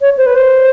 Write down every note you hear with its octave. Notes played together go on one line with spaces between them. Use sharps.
C#5
C5
B4
C5